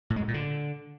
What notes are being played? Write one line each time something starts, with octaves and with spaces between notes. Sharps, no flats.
A2
G#3
B2
A#2
D3